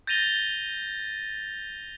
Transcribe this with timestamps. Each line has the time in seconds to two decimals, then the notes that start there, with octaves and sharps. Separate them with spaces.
0.07 G6 A6 A#6 D#7 F7 G7